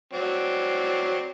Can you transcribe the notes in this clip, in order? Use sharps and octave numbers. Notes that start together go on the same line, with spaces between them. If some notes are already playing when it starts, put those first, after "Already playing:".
F#3 C4 D5